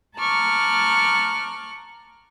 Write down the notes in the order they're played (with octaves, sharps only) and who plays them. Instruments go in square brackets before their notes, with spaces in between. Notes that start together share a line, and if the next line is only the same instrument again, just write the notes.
[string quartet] A5 A#5 C#6 D6 F6 F#6